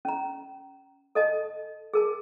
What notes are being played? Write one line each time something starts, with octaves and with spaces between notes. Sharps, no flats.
C#4 A#5
A4 D#5 A5
G#4 A#4 A5